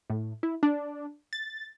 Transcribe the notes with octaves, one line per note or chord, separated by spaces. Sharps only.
A2
E4
D4
A6